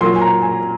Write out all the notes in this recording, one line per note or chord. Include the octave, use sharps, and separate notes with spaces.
A#2 F#3 A#3 C6
G#5
A#5
G#5